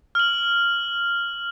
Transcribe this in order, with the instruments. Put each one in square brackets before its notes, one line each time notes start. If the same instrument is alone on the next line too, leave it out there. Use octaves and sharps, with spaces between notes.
[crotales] F6 F#7